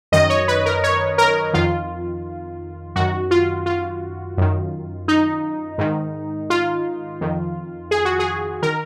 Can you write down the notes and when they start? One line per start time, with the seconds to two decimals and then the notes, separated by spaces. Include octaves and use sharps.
0.12 F#2 D#3 D#5
0.30 C#5
0.48 B4
0.66 A#4
0.84 C#5
1.18 A#4
1.53 F2 D#3 F4
2.96 F#2 D#3 F#4
3.31 F4
3.66 F4
4.38 F#2 D#3
5.08 D#4
5.78 G#2 D#3
6.50 F4
7.21 F2 D#3
7.91 G#4
8.05 F#4
8.19 G#4
8.63 D#3 A#4